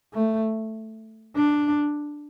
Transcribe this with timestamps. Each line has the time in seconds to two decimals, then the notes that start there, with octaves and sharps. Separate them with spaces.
0.14 A3
1.36 D4